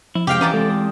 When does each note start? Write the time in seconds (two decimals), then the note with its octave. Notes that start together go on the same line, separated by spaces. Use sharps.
0.15 F3 E4
0.27 F2 C3 G#3 G4 F5 G5
0.41 E2 C#4 B4 D5 D#5 A5 A#5
0.54 G#3 C4 A4
0.69 D#6